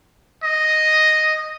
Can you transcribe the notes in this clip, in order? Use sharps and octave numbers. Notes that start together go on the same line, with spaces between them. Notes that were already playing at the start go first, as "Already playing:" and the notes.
D#5